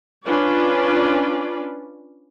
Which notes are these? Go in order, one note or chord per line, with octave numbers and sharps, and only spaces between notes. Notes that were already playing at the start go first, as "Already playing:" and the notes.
C#4 D4 F4 B4 D5